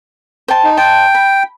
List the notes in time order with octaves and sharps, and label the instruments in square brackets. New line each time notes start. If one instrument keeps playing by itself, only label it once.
[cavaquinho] C5 G5 A5
[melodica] D#4
[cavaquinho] C5 D#5 A5 [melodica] G5
[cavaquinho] B5